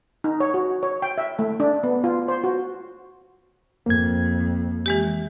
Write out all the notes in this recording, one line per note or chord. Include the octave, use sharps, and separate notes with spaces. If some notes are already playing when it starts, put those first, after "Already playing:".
D#4
C#5
F#4
C#5
G5
E5
A3
D4
B3
F4
C5
F#4
F2 A#3 G#6
E3 G#3 G4